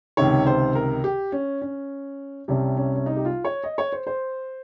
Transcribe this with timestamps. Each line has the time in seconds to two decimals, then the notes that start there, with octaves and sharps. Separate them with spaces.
0.17 C#2 C3 D#3 C#5
0.46 C5
0.75 A#4
1.04 G4
1.32 C#4
1.62 C#4
2.48 C2 C3 G3 C#4
2.77 C#4
2.96 C#4
3.06 D#4
3.16 G4
3.25 F4
3.45 C#5
3.64 D#5
3.78 C#5
3.92 C5
4.07 C5